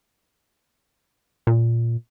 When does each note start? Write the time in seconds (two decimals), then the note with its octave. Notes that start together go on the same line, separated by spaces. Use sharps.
1.47 A#2